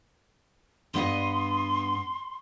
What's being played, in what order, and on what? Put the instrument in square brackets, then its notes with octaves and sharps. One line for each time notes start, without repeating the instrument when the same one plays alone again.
[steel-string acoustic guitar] G2 B3 D#5 [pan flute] C6